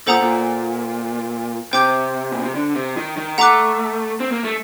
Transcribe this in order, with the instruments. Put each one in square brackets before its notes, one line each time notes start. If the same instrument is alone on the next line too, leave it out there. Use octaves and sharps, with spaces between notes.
[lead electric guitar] A#2 [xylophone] A4 C5 F#5 A#5 D#6
[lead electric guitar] A#2
[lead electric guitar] C3 [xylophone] C5 G5 D6 G6
[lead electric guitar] A#2
C3
D3
C3
D#3
D#3
[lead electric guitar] A3 [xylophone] F#5 A#5 D6 F#6
[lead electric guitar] C4
A#3
A3